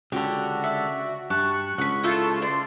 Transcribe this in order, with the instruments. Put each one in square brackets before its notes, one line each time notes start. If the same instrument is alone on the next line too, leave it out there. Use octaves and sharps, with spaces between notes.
[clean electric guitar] C#2 D3 [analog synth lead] F#4 [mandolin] G4
[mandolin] D5 E5
[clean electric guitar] G2 [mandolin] A5 [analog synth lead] C#6 [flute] F#6
[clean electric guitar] C#2 [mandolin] F#5 B5
[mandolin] E4 A4 G6 [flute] F4
[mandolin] D5 [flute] C6